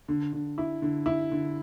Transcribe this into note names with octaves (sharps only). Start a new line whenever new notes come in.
D3
D3
E4
D3
E4
D3